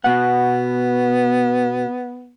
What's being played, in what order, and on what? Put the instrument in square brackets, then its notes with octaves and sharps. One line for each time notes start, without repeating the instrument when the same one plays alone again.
[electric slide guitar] B2 F#5 [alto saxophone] B3